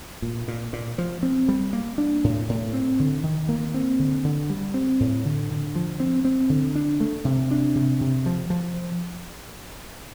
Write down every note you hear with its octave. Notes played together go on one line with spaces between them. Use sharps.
A#2
A#2
A#2
F3
C4
G3
A#3
D4
A2
A2
C4
D3
D#3
A#3
C4
D3
D3
G3
C4
A2
D3
D3
F3
C4
C4
D3
D4
A3
C3
D4
C3
C3
F3
F3